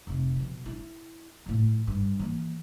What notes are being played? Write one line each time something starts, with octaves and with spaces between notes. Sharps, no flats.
F1 C3
B2 F3
E4
A2 F3
G2
E3 A#3